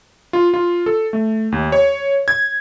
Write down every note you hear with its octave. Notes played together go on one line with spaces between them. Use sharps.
F4
F4
A4
A3
D#2
C#5
G#6